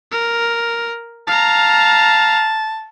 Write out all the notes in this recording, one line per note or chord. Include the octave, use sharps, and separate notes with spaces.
A#4
F5 A5 A#5